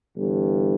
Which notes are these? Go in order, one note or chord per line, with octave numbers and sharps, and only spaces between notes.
G1 G2 E3